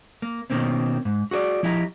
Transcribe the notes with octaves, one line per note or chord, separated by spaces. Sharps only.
A#3
B2 D#3 F3 A#3 C4 C#4
G#2
F#4 G#4 B4 D5
F3 E4 G4 D#5 G#5 A#5